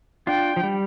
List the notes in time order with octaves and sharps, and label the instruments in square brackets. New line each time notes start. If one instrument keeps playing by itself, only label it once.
[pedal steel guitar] D4 F4 [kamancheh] G5
[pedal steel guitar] F3
G3